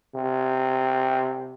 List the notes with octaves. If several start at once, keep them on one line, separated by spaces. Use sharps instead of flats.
C3